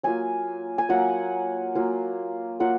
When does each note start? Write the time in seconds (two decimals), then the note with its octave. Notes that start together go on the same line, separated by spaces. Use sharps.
0.03 F#3 A#3 F4 G#5
0.78 G#5
0.89 F#3 A#3 F4 F#5
1.75 F#3 A#3 F4
2.60 F#3 A#3 F4 F#5